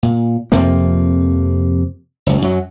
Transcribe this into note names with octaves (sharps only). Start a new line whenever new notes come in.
A#2
F2 C3 F3 A#3
F#1 C#2
F#2 F#3